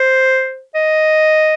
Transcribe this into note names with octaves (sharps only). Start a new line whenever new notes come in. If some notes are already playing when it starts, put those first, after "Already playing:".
Already playing: C5
D#5